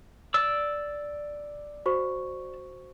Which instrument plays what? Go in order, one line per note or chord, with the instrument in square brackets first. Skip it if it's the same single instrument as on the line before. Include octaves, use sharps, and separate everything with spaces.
[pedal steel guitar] D5 E6
[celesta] F#4 C5 C#6